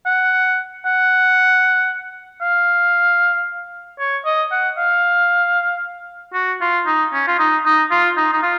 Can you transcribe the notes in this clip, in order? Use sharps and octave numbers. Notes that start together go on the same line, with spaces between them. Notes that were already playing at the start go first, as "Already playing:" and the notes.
F#5
F#5
F5
C#5
D#5
F#5
F5
F#4
F4
D#4
C#4
F4
D#4
D#4
F4
D#4
D#4
F4